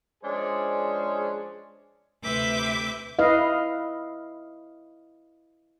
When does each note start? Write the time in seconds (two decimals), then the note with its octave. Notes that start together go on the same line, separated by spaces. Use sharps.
0.24 F3 G#3 C#4 D4 G#4 C5
2.22 D2 C3 B4 E5 D6 G6
3.19 E4 B4 D#5 F5